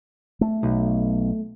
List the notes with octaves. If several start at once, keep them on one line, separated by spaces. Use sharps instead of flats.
A3
B1